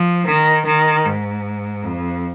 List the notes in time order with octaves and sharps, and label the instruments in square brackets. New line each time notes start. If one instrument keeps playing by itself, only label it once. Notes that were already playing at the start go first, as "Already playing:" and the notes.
Already playing: [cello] F3
D#3
D#3
G#2
F2